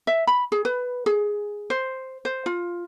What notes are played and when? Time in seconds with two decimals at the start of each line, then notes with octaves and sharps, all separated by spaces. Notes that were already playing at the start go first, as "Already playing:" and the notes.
0.07 E5
0.27 B5
0.52 G#4
0.65 B4
1.06 G#4
1.70 C5
2.25 C5
2.46 F4